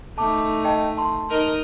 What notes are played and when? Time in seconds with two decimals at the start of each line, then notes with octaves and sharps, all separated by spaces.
0.18 A3 D#4 A5 D6
0.65 D#5 G5 A5
0.97 A5 C6
1.29 D#4 A#4 D#5